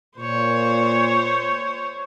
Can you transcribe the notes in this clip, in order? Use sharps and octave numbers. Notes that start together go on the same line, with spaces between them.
A#2 C5 C#5